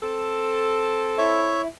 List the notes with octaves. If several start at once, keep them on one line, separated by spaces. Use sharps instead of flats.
C4 A4
E4 C#5 E5